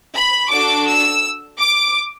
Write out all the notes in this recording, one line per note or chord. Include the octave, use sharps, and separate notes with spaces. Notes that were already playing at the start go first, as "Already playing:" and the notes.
B5
D4 F#4 A4 D6
E6
D6